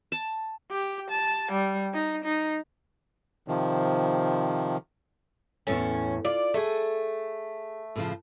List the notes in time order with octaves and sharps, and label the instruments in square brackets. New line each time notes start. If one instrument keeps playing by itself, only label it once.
[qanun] A5
[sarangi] G4
A5
G3
D#4
D#4
[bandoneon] C3 D#3 F3
[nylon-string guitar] E2 A2 A4 [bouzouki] C#4
[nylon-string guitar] F4 [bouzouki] D5
[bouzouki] A3 [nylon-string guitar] G#4 A4
[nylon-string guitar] A2 C#3 F3